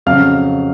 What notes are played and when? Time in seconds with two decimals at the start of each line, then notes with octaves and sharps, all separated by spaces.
0.06 F2 C#3 F#3 F5 F6